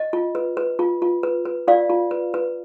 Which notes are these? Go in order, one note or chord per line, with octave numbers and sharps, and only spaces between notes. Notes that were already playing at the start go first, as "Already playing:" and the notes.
Already playing: D#5
F4
B4
B4
F4
F4
B4
B4
F4 D5 F5
F4
B4
B4